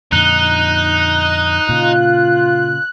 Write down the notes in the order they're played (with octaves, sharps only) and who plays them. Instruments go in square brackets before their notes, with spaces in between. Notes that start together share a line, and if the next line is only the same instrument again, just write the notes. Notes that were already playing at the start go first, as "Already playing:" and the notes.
[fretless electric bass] F2 A#2 D3 [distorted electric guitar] D#4 [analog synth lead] F#6
[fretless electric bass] A#2 C#3 [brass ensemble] F4